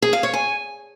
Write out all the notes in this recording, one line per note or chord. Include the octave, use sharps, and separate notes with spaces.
G#4
F5
C#5
G#5